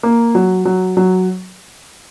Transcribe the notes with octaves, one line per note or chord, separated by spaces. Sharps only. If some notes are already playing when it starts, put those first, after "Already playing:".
A#3
F#3
F#3
F#3